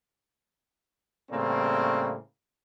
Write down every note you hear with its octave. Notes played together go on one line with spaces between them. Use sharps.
A2 C#3 G3 A#3 C4